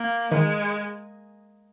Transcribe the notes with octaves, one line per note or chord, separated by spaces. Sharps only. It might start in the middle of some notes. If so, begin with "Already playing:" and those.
Already playing: A#3
D#3 G#3